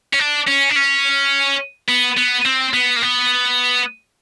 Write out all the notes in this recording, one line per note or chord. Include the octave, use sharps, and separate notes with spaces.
C#4
D4
C#4
D4
C#4
B3
B3
C4
B3
A#3
B3